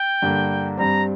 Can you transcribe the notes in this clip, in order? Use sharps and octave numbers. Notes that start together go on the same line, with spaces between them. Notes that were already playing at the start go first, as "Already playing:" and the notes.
Already playing: G5
G2 D3 A#3
G2 G3 C4 A#5